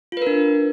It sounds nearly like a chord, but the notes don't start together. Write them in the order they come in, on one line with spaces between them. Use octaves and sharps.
F4 B4 A#4 D4